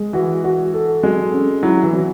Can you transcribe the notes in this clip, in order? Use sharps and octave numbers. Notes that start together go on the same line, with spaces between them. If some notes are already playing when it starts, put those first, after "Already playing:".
Already playing: G#3
E3 F#4
F#4
A4
F#3 G#3
C#4
F#3 E4
E3
F#3